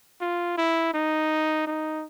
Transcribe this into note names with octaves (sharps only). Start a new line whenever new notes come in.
F4
E4
D#4
D#4